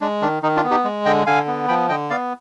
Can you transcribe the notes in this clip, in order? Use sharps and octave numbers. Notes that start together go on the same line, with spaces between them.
G#3 D4
D#3 D4
D#3 D#4
D4 F4
B3
D#4 G4
G#3
D3 D#5 G5
D3 F5 G#5
B3
F3 G5 B5
D3 D#5 G5
B3 D5 F5